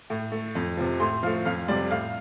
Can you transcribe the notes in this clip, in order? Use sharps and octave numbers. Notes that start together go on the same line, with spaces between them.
A2
A3
F2
C3 F3
A2 C6
F3 A3 F5
F2 F5
C3 G3 D5
A2 F5